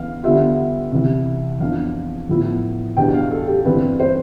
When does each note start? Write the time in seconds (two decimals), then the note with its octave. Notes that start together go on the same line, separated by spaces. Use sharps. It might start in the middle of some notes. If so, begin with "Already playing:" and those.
Already playing: E3 B3 F5
0.23 D3 G3 B3 F4 E5
0.92 C2 C3 E3 G3
1.60 F2 E3 B3 D4 F4 F5
2.28 A2 F3 B3 E4
2.97 E2 B2 G3 D4 G5
3.14 F5
3.31 A4
3.48 G4
3.65 G2 E3 G3 C4 B4
3.99 C5